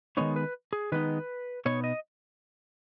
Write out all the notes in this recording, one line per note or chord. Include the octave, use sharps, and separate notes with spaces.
D#3 G#3 B3 D#4 C#5
B4
G#4
D#3 G#3 B3 D#4 B4
B2 B3 D#4 C#5
D#5